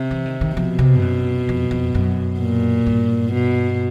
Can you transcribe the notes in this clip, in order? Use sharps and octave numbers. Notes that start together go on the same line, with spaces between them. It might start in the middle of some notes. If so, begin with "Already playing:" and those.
Already playing: C3
E3
D#3
D#3
B2 F3
C3
G2
F#2
F2
F2
F#2
A#2
G2
B2